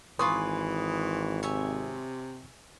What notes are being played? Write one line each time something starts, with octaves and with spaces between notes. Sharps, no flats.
G#1 E3 F4 B4 G#5 C6 C#6 D#6
C3 C#5 E5 G#5